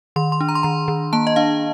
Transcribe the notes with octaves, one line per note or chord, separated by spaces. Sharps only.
D#3 C6
C6
D4
A#5
C6
D#3 A#5
D#3
A#3 A5
D#5
D4 F5